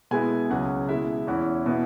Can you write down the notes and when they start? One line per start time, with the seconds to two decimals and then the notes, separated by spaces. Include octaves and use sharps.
0.11 B2 G#3 B3 E4 G#5
0.50 C#2 C#3 F#3 C#4 F#5
0.89 B2 G#3 E4 E5
1.27 E2 E3 C#4 E4 F#5
1.66 B2 B3 E4